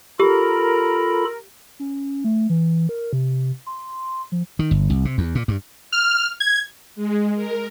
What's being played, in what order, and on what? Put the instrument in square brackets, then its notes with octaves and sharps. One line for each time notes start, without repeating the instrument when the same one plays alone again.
[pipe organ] F4 A4 B5 [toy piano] G4 [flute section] A#4
[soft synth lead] C#4
A3
E3
A#4
C3
C6
F3
[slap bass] D#3
G1
C2
C3
E2
A#2
G2
[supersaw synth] F6
G#6
[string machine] G#3
A#4